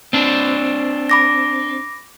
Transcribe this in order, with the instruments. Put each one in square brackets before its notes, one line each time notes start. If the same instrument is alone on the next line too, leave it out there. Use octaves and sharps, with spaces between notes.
[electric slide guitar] C4 D4
[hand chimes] B5 D6 A#6